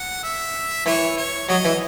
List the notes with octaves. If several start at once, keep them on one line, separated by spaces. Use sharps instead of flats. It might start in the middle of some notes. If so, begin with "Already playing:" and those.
Already playing: F#5
E5
E3 C#5
C#5
F#3 D#5
E3